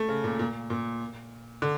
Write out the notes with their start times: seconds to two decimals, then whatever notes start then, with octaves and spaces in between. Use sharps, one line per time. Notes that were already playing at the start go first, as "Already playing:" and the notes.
Already playing: A3
0.08 C#3
0.24 A#2
0.39 A#2
0.70 A#2
1.62 D3